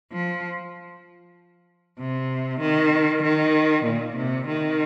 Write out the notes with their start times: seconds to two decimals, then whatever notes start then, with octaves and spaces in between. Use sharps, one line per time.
0.12 F3
1.99 C3
2.61 D#3
3.23 D#3
3.85 A#2
4.17 C3
4.48 D#3